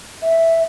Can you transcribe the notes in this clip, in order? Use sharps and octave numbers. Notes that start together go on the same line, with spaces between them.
E5